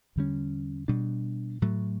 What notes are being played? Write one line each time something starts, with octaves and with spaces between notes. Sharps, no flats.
E2 D3 G3 C#4
B2 G3 D4
A2 F#3 A3